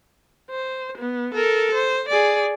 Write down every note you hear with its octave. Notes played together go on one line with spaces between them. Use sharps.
C5
B3
A4 A#4
C5
G#4 D5